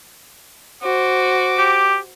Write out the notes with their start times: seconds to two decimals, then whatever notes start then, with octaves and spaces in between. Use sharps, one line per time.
0.83 F#4 C5 D6
1.58 G4